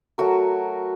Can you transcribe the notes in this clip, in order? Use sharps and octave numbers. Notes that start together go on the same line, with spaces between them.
F#3 A3 F#4 A#4